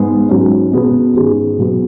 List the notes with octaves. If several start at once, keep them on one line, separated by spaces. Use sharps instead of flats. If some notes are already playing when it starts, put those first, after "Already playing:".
Already playing: G#2 G#3 B3 G#4
G#2 F#3 C#4
B2 B3 G#4
G#1 G#2 G#3 C#4 G#4
B2 F#3 B3 G#4